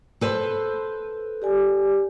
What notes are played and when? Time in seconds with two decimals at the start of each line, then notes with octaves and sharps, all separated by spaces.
0.21 A4 B4 C5
1.42 G4 D5 G#5